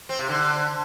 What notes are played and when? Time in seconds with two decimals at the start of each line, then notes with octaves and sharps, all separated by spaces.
0.09 C4
0.19 C3
0.29 D3